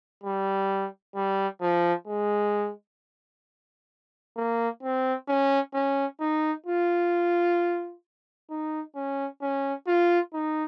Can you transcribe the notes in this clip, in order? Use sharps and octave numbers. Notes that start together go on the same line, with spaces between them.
G3
G3
F3
G#3
A#3
C4
C#4
C#4
D#4
F4
D#4
C#4
C#4
F4
D#4